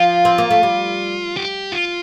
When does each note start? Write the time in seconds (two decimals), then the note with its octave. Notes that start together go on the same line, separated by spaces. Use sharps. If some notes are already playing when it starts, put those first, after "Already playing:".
Already playing: F3 F4
0.25 C4
0.38 A#3
0.51 A3
0.63 G3
1.37 G4
1.72 F4